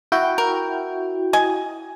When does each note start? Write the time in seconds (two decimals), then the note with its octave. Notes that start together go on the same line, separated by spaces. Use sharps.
0.12 E4 F#4 G5
0.38 A#4
1.33 D#5 G#5